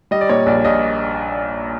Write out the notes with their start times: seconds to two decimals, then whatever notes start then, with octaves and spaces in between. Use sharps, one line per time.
0.11 G3 D#5
0.21 D5
0.29 A#2 C#5
0.46 A#1 D5
0.65 A#1 D#5